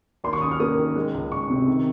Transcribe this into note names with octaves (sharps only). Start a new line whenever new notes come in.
D#2 C6
C#6
C#4 D#6
F6
A#3 D#6
D#3
G#3
C#2
C#2 C#6
C3
D#3